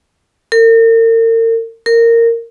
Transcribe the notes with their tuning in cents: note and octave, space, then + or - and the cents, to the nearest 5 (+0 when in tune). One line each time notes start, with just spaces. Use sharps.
A#4 -40
A#4 -15